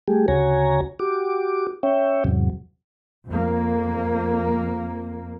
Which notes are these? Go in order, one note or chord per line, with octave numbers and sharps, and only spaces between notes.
G3 A3 G4 G#4
D2 C#3 F#4 C#5 G#5 A#5
F#4 G4 D6
C#4 C#5 E5 G5
E2 G#2 C3 F#3
F2 A#3